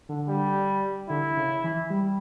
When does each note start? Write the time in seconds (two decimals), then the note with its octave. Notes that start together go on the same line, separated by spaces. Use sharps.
0.09 D3
0.29 G3
1.10 D3 E4
1.37 C#3
1.64 E3
1.90 G3